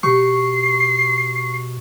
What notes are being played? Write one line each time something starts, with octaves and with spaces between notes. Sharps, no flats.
B2 G4 C#6 C7